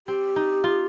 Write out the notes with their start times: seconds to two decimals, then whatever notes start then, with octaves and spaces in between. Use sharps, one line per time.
0.07 C4 G4
0.36 D#4
0.64 F4